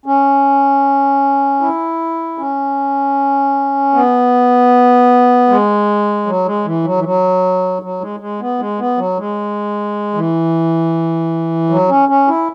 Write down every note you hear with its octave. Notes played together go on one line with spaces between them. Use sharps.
C#4
E4
C#4
B3
G#3
F#3
G#3
E3
F#3
E3
F#3
F#3
G#3
G#3
B3
G#3
B3
F#3
G#3
E3
F#3
C#4
C#4
E4